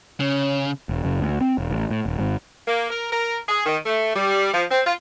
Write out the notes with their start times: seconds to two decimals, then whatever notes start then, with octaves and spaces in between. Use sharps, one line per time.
0.20 C#3 C#4
0.89 E1
1.05 F#1
1.20 D2
1.41 C4
1.58 E1
1.71 A1
1.91 A2
2.06 D#1
2.19 G#1
2.66 A#3
2.91 A#4
3.12 A#4
3.48 G#4
3.65 D#3
3.85 A3
4.15 G3
4.53 F3
4.70 C4
4.85 F4